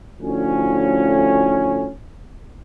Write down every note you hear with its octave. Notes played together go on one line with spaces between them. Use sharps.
D2 A2 F3 C#4